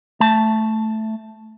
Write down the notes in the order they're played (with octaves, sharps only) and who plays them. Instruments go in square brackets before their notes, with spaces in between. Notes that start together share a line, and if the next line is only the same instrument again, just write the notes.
[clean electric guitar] A3 A5